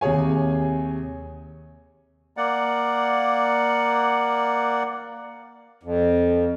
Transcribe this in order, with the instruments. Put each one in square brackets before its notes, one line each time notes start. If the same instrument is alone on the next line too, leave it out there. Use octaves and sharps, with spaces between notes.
[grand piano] D#2 C3 G#4 C#5 G#5
[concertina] A#3 D5 F#5
[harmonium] F2